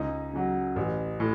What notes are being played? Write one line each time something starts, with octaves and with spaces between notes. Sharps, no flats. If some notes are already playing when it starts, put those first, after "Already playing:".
Already playing: C#2 D#4 D#5
C#3 F#3
A1
A2